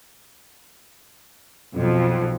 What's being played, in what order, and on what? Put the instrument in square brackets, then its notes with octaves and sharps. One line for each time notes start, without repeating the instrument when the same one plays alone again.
[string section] B1 F2